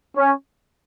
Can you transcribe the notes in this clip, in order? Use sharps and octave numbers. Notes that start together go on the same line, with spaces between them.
C#4